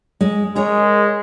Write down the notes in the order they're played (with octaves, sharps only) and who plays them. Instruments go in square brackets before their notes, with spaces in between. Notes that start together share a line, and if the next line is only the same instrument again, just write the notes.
[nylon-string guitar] G#3
[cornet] G#3 [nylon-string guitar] G#4 A#4 C#5